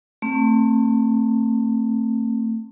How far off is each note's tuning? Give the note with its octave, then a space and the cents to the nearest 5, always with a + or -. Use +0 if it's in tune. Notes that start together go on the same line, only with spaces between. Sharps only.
A3 +30 C4 +25